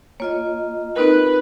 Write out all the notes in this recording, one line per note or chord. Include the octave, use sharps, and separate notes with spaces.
A#3 F4 C#5 D#5
C4 D#4 A#4 B4